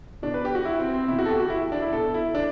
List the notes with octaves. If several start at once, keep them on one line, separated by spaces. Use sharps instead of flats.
B2 D4
B4
G4
F#4
E4
C4
C4
B2 E4
F#4
A4
G4
F#4
E4
D4
E4
B2 A4
E4
D4